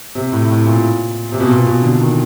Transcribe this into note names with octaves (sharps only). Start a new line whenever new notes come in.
C3
A2
A2
A#2
C3
B2
A#2
B2
D3
D#3